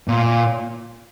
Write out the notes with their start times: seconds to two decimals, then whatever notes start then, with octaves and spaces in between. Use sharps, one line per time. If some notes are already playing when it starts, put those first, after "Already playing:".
0.08 A#2